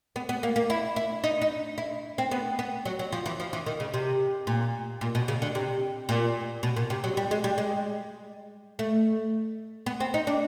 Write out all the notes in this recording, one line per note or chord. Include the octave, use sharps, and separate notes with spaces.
B3
B3
A#3
A#3
E4
E4
D#4
D#4
E4
C4
B3
B3
F#3
F#3
F3
E3
F3
E3
D#3
C#3
C3
A#2
A#2
B2
C#3
D3
C3
A#2
B2
A#2
C3
F#3
G3
G#3
G3
G#3
A3
B3
C4
D#4
D4